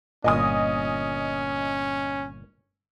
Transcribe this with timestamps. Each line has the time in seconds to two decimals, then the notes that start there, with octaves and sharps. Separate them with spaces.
0.24 G1 A#2 C#4 D#5 G#5 D#6